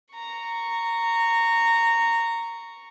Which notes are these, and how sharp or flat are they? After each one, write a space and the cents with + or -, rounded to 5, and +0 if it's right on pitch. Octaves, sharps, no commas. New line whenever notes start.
A#5 -15 C#6 +0